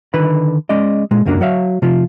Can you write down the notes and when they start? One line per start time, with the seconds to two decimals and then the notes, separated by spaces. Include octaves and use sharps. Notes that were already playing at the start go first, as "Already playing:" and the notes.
0.14 D3 D#3 B4 B5
0.69 G#3 C#4 D5 D#5
1.11 A#2 G#3
1.25 C#2 F#2 F#3 A#3 D4
1.41 F#3 F#4 C#5 E5 F5
1.82 C3 F3 F4